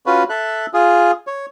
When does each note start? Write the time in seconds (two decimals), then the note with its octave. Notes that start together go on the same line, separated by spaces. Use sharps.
0.06 C#4 F4 F#4 B4
0.29 A4 E5 F#6
0.74 F4 G#4
1.27 C#5